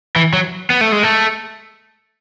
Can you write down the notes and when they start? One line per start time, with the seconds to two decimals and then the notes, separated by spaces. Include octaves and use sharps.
0.16 E3
0.33 F#3
0.70 B3
0.81 A3
0.92 G#3
1.03 A3